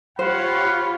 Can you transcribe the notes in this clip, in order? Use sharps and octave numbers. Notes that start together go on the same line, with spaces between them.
F4 G4 C5 C#5 F5 F#5 B5